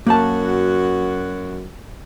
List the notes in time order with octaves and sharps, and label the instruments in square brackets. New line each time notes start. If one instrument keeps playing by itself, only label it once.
[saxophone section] F#2 F#4 [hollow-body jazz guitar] A#3 A5